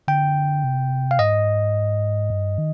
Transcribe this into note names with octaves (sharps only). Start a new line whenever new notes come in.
D3 G5
C3
F5
G#2 D#5
G2
D#3